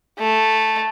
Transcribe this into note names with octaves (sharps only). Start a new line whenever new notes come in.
A3